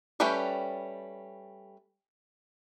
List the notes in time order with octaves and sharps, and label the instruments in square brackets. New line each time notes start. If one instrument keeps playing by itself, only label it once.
[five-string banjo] G3 A3 C#4 B4 G5